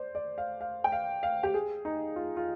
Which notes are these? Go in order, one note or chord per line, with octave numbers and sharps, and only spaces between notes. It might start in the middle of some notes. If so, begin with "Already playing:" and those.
Already playing: C5 D5
D5
F5
F5
G5
F5
F5
G4
G#4
D#4
F4
F4